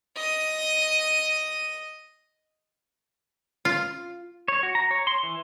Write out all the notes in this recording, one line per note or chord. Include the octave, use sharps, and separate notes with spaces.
D#5 D#7
F4
C#5
F#4
A#5
C#5
C6
E3